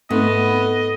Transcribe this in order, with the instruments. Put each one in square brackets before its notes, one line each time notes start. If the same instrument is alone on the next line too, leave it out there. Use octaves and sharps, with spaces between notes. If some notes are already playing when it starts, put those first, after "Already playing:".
[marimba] G#2 C4 D#4 [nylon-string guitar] A3 [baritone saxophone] B3 [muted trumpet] D#5